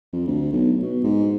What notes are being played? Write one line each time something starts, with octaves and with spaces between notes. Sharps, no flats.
F2
D2
B1
B2
G#2